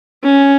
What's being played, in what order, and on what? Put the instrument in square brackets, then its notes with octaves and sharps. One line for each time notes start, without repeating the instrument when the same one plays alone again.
[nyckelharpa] C#4